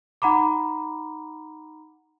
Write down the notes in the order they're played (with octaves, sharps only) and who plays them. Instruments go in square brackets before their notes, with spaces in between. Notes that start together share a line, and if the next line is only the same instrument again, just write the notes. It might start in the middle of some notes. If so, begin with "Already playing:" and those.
[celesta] D#4 F#5 A#5 B5 D6